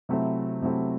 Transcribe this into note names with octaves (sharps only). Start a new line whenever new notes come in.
C3 F#3 A3 C4 E4
C3 F#3 A3 C4 E4